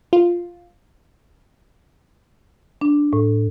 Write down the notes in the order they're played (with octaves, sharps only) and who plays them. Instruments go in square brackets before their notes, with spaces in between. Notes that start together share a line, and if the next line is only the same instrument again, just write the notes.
[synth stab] F4
[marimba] D4
A2